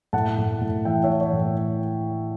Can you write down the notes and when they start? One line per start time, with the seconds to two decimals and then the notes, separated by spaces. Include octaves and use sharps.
0.13 A2 F#5 A5
0.38 A2
0.61 A2
0.85 E3 E5 G5
1.04 C#5 E5
1.10 E3
1.21 C#5
1.33 A2